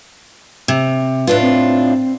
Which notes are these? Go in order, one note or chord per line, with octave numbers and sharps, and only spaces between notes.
C3
A2 D4 F4 B4
C4